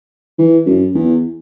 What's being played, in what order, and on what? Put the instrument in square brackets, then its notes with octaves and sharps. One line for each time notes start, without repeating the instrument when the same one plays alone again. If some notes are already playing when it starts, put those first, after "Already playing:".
[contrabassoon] E3
F#2
E2